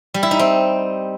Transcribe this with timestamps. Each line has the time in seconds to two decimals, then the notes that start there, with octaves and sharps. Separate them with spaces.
0.14 G3
0.23 E4
0.31 D#4
0.39 C4